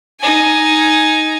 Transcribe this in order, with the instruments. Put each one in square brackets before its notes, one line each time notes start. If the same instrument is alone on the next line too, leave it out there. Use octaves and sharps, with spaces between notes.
[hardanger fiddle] D#4 G#5